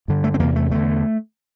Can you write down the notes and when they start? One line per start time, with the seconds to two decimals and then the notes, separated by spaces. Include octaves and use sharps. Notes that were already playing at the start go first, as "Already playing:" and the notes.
0.08 G2 D3
0.24 A3
0.34 C4
0.39 E2 C3 A#3
0.56 A3
0.71 E2 D3 A3